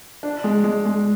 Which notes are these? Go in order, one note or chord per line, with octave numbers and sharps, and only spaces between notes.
D4
G#3
G#3
G#3